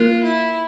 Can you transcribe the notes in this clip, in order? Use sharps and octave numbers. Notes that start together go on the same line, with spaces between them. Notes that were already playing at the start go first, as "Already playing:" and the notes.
Already playing: A#3 F4 A#4
E4